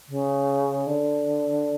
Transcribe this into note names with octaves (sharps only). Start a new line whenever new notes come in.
C#3
D3